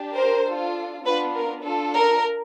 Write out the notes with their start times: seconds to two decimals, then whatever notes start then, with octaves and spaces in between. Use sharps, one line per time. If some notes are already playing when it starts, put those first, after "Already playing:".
Already playing: D4 G4
0.15 A#4 C5
0.46 D4 F4 A4
1.04 B3 D4 F4 A4 B4
1.34 A#4
1.63 D4 F4 A4
1.93 A#4